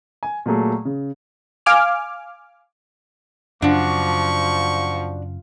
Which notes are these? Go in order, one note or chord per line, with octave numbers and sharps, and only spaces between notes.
G#5
A#2 F#3 A3 G#4
C#3
F5 G#5 D6 F6
F#2 C#3 F3 D4 F#4 C#6